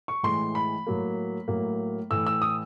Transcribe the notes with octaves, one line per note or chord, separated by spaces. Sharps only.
C#6
A2 E3 G#3 C6
B5
A2 F#3 A#3
A2 F#3 A#3
A2 E3 A3 E6
E6
D#6